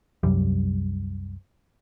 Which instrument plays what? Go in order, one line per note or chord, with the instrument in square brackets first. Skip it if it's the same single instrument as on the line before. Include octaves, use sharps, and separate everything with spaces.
[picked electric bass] C2 F#2 G3